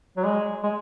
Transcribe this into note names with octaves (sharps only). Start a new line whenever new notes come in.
F#3
G#3
G#3